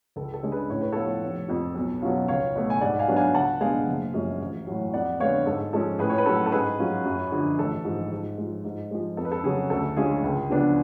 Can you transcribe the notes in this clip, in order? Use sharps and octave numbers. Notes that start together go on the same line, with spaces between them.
C#2 A4
A4
C#3 G#3 D4
G#4 B4
A2 C#5
B4
F3 B3 F4 A4 C#5
F1
F2 F3
B1
B2 F#3 C#4 F4
C#2 C#5 F5
B2 A3
G#5
G#2 D5 F#5
F5 G#5
F#3 B3 D4
F5 G#5
C#2 F#5 A5
B2 G#3 B3 D4 F5 G#5
F#1
F#2 F3 G#3
A1
A2 F#3
F2 D5 F#5
D3 G#3 B3 C#5 F5
G#2 A4
F3 G#3 C#4 A4
A2 G#4 B4
C#5
B4
F#3 C#4 A4
A4
G#2 G#4 B4
F#3 C#4 F4
F#2
D3 F3
A1 A4
G#2 F3
G#2
F3 G#3
G#2
F3 G#3
F2 A4
B4
A4
C#3 F#3 C#4 G#4
D2 A4
D3 G#3 C#4 F4 G#4
C#2
C#3 F3 B3 D4